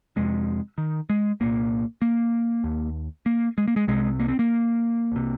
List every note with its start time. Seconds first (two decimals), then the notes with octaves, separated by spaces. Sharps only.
0.16 F2 C3 G#3
0.78 D#3
1.10 G#3
1.40 C2 A#2 A#3
2.02 A#3
2.64 D#2
3.26 A#3
3.58 G#3
3.68 A#3
3.76 G#3
3.87 C2 C3 G#3
4.20 A#3
4.28 C4
4.39 A#3
5.12 C2 C3